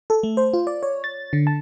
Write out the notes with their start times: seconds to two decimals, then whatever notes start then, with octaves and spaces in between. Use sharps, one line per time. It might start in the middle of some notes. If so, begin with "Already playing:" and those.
0.10 A4
0.23 A3
0.37 C5
0.53 F4
0.67 D5
0.83 C#5
1.04 A6
1.33 D3
1.47 A5